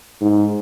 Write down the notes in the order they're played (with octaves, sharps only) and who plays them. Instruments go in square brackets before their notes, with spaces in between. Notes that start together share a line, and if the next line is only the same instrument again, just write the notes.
[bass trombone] G#2